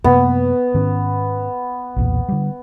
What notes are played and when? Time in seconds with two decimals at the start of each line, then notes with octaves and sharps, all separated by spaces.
0.04 F#2 C3 A#3 B3
0.74 G#2 D#3 C#4
1.96 B1 E2 A#2
2.29 D3 G3